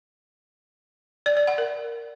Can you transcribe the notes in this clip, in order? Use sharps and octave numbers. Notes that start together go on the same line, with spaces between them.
D5
D5
F#5
A#4